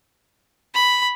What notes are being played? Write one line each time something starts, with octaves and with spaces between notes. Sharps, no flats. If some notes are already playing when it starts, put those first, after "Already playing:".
B5